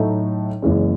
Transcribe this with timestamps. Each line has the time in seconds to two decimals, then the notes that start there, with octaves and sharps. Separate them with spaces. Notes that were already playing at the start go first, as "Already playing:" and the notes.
Already playing: A2 F#3 A3 D#4
0.62 F#1 F#2 E3 G#3 C#4